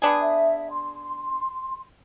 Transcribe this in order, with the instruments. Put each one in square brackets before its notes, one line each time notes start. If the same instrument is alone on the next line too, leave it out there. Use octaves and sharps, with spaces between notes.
[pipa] B3 D4 G#4
[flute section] E5
C6